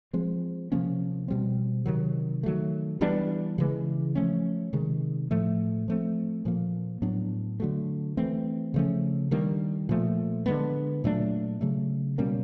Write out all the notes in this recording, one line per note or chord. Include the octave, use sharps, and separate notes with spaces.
F3 G#3 C4
C3 F3 A#3 C#4
B2 G3 C4
C3 D#3 F#3
D#3 F#3 A3
E3 G3 B3 D4
C#3 E3 G#3
F3 A3 C#4
C3 D#3 G#3
A2 F3 A3
F3 A3 C4
A#2 F3 A#3
A2 F#3 B3 D4
D3 F#3 A3
E3 A3 C4
C#3 F3 A3 C#4
D#3 G3 A#3 D4
A#2 F3 A3
D3 F3 G#3 B3
A#2 F#3 A3 D4
C#3 F#3 A3
B2 G3 A#3 C#4